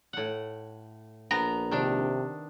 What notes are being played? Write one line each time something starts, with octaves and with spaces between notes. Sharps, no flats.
A2 F#5
A#1 B3 A#5
C3 D#3 D4